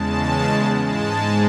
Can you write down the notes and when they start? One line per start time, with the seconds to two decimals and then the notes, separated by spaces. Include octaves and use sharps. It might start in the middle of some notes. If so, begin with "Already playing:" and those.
Already playing: E2 C#3 G#3 A5
0.85 G#2 G#3 A5